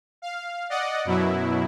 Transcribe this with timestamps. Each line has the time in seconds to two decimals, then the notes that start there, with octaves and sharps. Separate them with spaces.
0.22 F5
0.70 D5 D#5 F#5
1.05 F#2 B2 F#3 E4